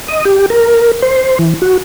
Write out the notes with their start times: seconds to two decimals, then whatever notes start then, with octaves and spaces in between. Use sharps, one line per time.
0.08 D#5
0.25 G4
0.50 A#4
1.02 C5
1.39 E3
1.62 F#4